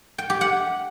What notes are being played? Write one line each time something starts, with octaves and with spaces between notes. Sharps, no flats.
G5
G4
F#5